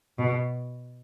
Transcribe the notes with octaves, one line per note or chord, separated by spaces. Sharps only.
B2